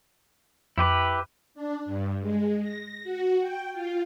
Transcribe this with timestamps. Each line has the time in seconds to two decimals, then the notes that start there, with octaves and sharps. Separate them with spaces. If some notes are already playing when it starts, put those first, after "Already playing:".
0.78 F2 E4 G4 B4
1.54 D4
1.85 G2
2.20 G#3
2.61 A#6
3.03 F#4
3.41 G5
3.72 F4